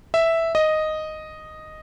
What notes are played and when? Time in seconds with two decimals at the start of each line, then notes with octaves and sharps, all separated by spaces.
0.14 E5
0.55 D#5